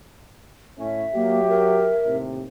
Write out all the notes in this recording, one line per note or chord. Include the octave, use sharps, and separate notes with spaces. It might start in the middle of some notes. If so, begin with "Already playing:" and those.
A2 C#4 E5
F#3 A#3 G4
A#4
D#2 A2 C3